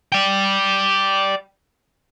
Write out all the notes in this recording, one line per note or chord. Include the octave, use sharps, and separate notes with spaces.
D5 G5